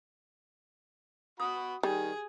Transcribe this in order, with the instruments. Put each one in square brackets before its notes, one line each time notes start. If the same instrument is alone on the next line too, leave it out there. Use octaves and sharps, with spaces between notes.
[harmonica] F#4 B5 [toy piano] D#6
[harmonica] D#3 [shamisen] G3 [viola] G#4